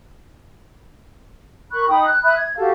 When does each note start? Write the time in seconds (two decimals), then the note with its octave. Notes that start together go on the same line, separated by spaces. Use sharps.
1.72 A#4 B5 C#6 F#6
1.88 D#4 G5 B5 D#6
2.06 F#6
2.23 E5 B5 D#6 F#6
2.36 G#6
2.56 F#4 G4 A4 F5